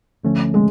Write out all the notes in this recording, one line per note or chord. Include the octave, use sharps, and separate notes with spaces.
D2 D3 F3 A3 C#4
G#3